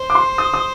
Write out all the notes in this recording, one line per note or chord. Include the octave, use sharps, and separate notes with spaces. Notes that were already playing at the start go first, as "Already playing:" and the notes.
Already playing: C5
D6
C6
D#6
D#6